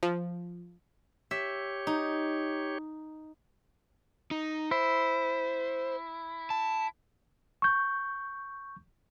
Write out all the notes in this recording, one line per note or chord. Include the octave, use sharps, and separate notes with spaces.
F3
G4 C#5 E5
D#4
D#4
E4 C5
A5
C#6 G6